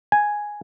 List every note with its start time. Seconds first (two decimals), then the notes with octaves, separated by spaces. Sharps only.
0.12 G#5